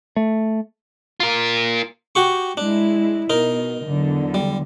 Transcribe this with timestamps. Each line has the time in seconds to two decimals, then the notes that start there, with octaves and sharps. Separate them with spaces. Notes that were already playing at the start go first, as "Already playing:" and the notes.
0.16 A3
1.20 F4 A#4
2.15 F#4 G4 C#6
2.57 G#3 D4 E4
3.30 B2 D#4 A#4
3.84 E2 D3 F#3
4.34 G3